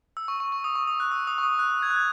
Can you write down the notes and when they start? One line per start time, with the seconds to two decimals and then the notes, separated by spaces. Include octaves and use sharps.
0.17 E6
0.28 C#6
0.40 C#6
0.52 C#6
0.64 D#6
0.76 C#6
0.87 D#6
1.00 F#6
1.11 E6
1.27 D#6
1.38 C#6
1.43 D#6
1.59 F#6
1.82 G#6
1.90 F#6
1.96 G#6